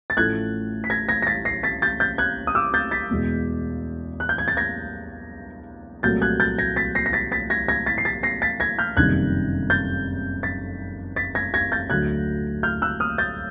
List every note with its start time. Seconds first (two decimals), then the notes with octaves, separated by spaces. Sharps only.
0.10 A6
0.17 A1 A2 F3 A3 F#6 G#6
0.84 B6
0.90 G#6 A#6
1.09 G#6 A#6
1.22 A#6
1.27 A6 B6
1.45 A#6 C7
1.63 A6 B6
1.82 G6 A6
2.00 G6 A6
2.18 F#6 G#6
2.47 D#6
2.55 D6 E6
2.74 G6 A6
2.91 A6 B6
3.10 E2 B2 G#3
4.20 F#6
4.29 G6
4.38 G#6
4.48 A6
4.57 G#6 A#6
6.03 C2 A#2 F#3 A3 G6 A6
6.22 F#6 G#6
6.40 G6 A6
6.58 G#6 A#6
6.76 A6 B6
6.95 A#6 C7
7.06 A#6
7.13 A6 B6
7.32 A6 B6
7.50 G#6 A#6
7.68 G#6 A#6
7.86 A6 B6
7.98 C7
8.05 A6 B6
8.23 A#6 C7
8.42 A6 B6
8.60 G#6 A#6
8.79 F6 G6
8.97 F#1 F2 C3 D#3 G3 F#6 G#6
9.70 G6 A6
10.43 A6 B6
11.16 A6 B6
11.35 G#6 A#6
11.54 G#6 A#6
11.72 G6 A6
11.90 D2 D3 F#3 F#6 G#6
12.63 F6 G6
12.82 E6 F#6
13.00 D#6 F6
13.18 G6 A6